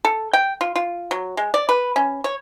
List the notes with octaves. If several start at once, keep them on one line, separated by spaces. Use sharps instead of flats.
A4
G5
F4
F4
F#3
G#3
D5
B4
C#4
C#5